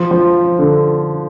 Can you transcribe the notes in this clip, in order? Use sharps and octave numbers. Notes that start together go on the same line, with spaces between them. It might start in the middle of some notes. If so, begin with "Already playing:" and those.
Already playing: F3
F3
D3